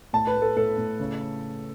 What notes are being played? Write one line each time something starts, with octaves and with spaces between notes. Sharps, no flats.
A2 A5
B4
A3
A4
A2 A4
A2
C#3